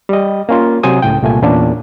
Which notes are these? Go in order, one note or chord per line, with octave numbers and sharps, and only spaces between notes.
G3 D#5
A#3 C#4 F4
C3 F#3 C5 G#5 D#6
C#2 A2 G5
C2 A#2 A3 G#5
E2 A#2 C#4 D4